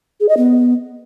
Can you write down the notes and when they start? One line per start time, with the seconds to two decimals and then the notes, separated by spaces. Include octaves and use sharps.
0.20 G#4
0.29 D#5
0.37 B3